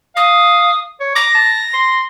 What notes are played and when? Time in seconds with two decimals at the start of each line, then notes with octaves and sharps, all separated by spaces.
0.16 F5 D#6
1.00 C#5
1.15 D6 A#6
1.35 A5
1.74 C6